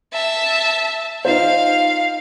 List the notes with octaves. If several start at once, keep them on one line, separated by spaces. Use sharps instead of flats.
E5 A5
D#4 F4 C5 F5